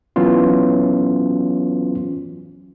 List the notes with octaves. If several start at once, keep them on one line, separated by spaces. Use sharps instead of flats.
E3 F#3 B3 C#4 F4